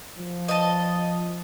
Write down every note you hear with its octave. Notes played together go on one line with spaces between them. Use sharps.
F3
D#5 A5